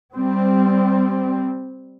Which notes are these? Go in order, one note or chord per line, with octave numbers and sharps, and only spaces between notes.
G3 C4